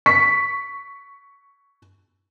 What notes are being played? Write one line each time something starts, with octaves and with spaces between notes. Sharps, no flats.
C#6 B6